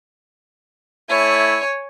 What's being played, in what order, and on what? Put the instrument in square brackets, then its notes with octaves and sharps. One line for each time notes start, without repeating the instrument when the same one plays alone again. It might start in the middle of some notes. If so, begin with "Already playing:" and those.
[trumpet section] A3 E4 [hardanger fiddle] C#5 G#5